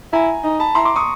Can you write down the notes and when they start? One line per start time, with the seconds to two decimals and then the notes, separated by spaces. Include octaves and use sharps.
0.13 E4 G#5 A#5
0.44 D#4
0.60 A5 B5
0.75 E4 A#5 C6
0.85 C6 D6
0.96 C#6 D#6